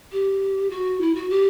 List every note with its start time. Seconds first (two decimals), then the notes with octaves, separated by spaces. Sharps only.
0.12 G4
0.70 F#4
1.00 E4
1.15 F#4
1.30 G4